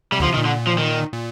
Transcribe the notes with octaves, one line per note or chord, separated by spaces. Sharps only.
C3 G3
D2 D3
F3
C3
D#3
A#2
D3
F3
D#3
A#2